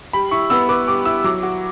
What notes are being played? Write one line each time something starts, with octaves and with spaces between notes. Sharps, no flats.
G3 B5
E4 C#6
B3 E6
B4 D6
G3 D6
E4 E6
F#3 D6
F#4